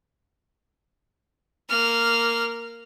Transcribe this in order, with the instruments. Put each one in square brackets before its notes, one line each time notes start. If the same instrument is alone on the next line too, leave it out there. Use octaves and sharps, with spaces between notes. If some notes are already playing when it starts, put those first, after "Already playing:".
[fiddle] A#3 F6